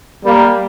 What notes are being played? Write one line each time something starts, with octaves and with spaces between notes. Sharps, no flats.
G3 A#3